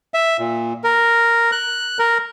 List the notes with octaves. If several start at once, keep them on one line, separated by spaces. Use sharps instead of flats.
E5
A#2
A#4
F#6
A#4